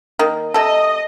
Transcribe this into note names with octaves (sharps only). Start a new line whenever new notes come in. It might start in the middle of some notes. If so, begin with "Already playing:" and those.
D#3 A#3
C3 A4 D#5